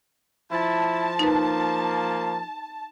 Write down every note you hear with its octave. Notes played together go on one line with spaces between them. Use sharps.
F3 E4 A5
A#3 D#4 B4